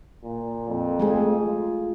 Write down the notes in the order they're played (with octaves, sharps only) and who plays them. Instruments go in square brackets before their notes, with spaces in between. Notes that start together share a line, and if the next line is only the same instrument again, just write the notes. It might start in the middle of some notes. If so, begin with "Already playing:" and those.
[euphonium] A#2
F2
[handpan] G#3 A3 G#4
[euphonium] F4